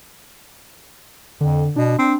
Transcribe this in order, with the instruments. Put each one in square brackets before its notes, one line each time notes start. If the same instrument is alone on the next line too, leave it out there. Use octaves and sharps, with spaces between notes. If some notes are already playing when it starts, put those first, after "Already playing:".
[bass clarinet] F2 [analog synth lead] D3
[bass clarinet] B2 [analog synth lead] D4
[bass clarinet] C4 [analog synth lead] D4